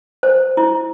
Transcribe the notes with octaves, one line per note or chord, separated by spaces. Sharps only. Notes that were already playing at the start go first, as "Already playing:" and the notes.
C5
E4